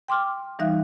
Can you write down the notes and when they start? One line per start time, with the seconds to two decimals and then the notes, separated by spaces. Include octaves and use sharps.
0.08 G5 C6 D6 F6
0.59 E3 G3 D#4 E5 F5 F#6